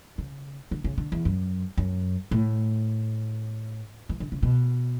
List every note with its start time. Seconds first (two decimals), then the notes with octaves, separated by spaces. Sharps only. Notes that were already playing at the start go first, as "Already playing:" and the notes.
0.18 C#3
0.71 D3
0.84 C#3
0.98 D3
1.12 E2
1.25 F#2
1.77 F#2
2.31 A2
4.09 E3
4.20 D3
4.32 C#3
4.43 B2